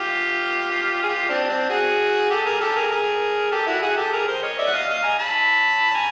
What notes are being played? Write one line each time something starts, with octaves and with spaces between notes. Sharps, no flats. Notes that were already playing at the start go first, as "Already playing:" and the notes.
Already playing: F4 G4
G#4
F4 G4
C4 D4
C4 D4
F#4 G#4
G4 A4
G#4 A#4
G4 A4
G#4 A#4
G#4 A#4
G4 A4
E4 F#4
F#4 G#4
G4 A4
G#4 A#4
A#4 C5
C#5 D#5
D5 E5
F#5
D#5 F5
D#5 F5
G#5 A#5
A5 B5
A5
G#5 A#5